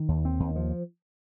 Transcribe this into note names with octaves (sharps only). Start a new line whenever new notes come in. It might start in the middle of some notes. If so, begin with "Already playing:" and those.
Already playing: D#3
D#2
C4
D#2
F3